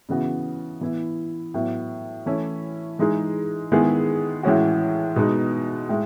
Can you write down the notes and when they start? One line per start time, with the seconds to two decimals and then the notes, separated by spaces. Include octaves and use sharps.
0.09 C#3 E3 B3 F#4
0.81 E3 B3 E4
1.54 A2 F#3 B3
2.26 E3 A3 C#4 E4
2.99 E3 G#3 D#4 G#4
3.72 D#3 G#3 B3 E4 G#4
4.43 A2 E3 G#3 C#4 F#4
5.16 B2 G#3 B3 D#4
5.89 A2 G#3